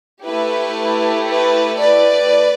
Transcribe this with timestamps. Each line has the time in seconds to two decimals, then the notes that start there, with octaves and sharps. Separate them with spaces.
0.24 A3 E4 G4 B4
1.28 B4
1.79 B4 D5